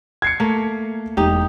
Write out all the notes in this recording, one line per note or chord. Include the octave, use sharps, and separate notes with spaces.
G#6 C7 C#7
A3 A#3
E1 D#4 G4